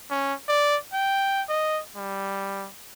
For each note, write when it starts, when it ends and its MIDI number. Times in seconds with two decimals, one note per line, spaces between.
0.10 0.34 61
0.49 0.77 74
0.94 1.42 79
1.49 1.81 75
1.96 2.67 55